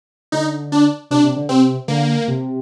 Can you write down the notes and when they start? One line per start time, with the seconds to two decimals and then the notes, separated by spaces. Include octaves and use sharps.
0.32 D3 D#4
0.72 D4
1.11 C3 D4
1.24 C3
1.36 D3
1.49 C3 C4
1.88 D3 A#3
2.28 C3